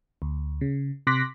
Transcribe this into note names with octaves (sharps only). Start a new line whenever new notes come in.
D2
C#3
C3 C6 D6 F#6 A#6 B6